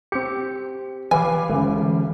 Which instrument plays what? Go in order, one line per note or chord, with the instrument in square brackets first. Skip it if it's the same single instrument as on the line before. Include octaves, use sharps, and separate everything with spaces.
[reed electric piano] C4 G4 [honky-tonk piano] C#7
[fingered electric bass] E3 F3 [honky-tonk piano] B4 F5 D6 [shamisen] G#5
[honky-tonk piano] D2 C#3 [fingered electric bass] E3 G#3